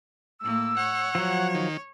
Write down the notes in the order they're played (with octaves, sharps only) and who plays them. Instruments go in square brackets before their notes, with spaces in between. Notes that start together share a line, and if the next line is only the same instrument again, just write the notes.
[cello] A2 A#3 [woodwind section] E6
[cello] C#5 [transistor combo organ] F#5
[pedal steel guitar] F3 F#3
[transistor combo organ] D#3